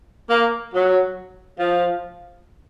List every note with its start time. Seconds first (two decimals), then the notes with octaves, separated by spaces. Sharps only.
0.30 A#3
0.73 F#3
1.58 F3